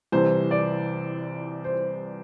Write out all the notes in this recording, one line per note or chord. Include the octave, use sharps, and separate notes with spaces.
C2 C3 E3 C5
D5
C5